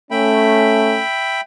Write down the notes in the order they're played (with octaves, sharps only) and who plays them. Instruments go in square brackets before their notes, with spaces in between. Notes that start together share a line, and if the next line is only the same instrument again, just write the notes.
[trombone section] A3 C#4 [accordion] E5 G5 B5